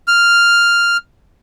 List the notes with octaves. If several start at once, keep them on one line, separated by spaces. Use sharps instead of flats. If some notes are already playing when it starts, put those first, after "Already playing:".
F6